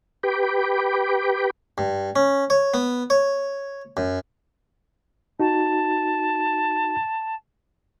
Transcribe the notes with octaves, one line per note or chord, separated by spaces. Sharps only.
G4 B4 G5 B5 D6
G2
C#4
C#5
B3
C#5
F#2
D#4 F#4 A5